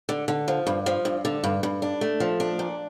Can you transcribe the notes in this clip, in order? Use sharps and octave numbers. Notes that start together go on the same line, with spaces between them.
D3
D3
F3
G2
F3
G2
D3
G2
G2
D4
A3
F3
D4
A#2